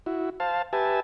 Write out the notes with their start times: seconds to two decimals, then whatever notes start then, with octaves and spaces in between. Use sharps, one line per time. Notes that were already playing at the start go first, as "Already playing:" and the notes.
0.06 E4 F#4
0.40 C5 F5 A5
0.73 G4 B4 E5 G#5 A5